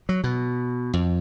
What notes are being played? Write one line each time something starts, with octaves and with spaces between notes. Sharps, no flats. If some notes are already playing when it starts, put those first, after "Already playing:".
F#3
B2
F2